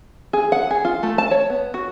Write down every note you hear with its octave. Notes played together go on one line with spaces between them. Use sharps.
G#4
F#5
G#4
F4
A3
A5
C#5
B3
F#4